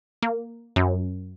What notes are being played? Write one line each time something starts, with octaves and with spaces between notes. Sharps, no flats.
A#3
F#2